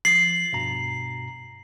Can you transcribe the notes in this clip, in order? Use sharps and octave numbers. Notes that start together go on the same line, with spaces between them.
F3 A6 C7 F#7
G2 B2 A#5